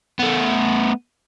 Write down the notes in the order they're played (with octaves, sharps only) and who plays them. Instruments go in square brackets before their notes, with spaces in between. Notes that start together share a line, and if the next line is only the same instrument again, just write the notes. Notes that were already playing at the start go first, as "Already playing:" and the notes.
[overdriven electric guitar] A3 B3